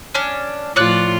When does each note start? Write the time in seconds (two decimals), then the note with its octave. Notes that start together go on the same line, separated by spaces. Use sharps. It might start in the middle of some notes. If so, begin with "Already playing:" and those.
0.15 C#4 D4
0.76 A2 F3 F4 C#5 D5 F#6